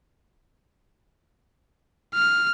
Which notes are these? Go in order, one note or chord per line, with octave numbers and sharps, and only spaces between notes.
F6